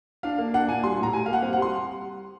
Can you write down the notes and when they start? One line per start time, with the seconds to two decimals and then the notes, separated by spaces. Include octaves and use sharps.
0.23 D4 F5
0.38 A#3
0.54 D4 F#5
0.68 A#2 G#5
0.84 G3 C6
0.98 A2
1.03 A#5
1.13 G3 G#5
1.26 A#3 F5
1.33 F#5
1.42 C4 F5
1.53 F#5
1.58 G3 C6